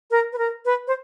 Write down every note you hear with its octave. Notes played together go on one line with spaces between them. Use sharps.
A#4
B4
A#4
B4
C5